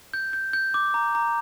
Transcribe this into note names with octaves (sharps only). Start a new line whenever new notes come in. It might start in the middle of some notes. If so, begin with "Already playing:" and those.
G6
G6
G6
D6
A#5
A#5